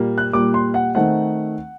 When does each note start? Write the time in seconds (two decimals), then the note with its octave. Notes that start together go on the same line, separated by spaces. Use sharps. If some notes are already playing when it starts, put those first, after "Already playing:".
Already playing: A#2 G3 A#3
0.18 F#6
0.33 A#2 G3 A#3 D6
0.54 C6
0.74 F#5
0.95 D#3 A3 C4 D#4 F#5